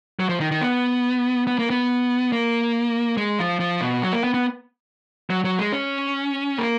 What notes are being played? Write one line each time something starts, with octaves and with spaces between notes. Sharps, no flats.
F#3
F3
D#3
D#3
B3
B3
A#3
B3
A#3
G#3
F3
F3
B2
F#3
A#3
B3
B3
F#3
F#3
G#3
C#4
A#3